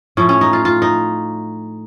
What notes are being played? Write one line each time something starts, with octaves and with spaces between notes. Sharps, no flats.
A2 F3 C#4
C#4
D#4
F4
F4
D#4